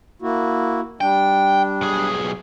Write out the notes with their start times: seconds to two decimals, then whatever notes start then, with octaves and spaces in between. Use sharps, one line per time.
0.22 A#3 E4 F#4
1.01 G3 D4 G5
1.81 B1 G#4